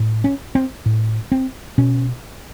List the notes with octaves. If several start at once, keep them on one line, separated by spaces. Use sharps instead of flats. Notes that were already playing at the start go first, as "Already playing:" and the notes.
Already playing: A2
C#4
C4
A2
C4
B2 C#4